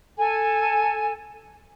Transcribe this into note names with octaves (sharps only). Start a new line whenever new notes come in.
A4 G#5